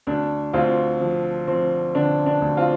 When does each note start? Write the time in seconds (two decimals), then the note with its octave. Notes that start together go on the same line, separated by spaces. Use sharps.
0.07 D2 D4
0.53 D2 C4 F4
1.01 F3
1.48 F3 C4
1.95 D3 D4
2.26 D4
2.42 D2
2.57 C4 F4